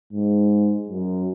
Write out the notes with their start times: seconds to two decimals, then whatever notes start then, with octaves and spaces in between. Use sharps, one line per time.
0.13 G#2
0.89 F#2